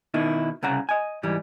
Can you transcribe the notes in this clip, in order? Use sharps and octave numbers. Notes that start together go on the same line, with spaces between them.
B2 D#3 D#4 E4
C2 C#3 F#5 A#5
D#5 G#5
G#2 E3 G3